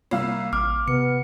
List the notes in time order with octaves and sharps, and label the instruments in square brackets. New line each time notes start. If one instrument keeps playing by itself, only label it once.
[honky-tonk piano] C2 F5 E6 [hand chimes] A#3
[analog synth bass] A1 [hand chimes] D6 [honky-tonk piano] F6
[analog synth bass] C3 [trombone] B3 [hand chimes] C#7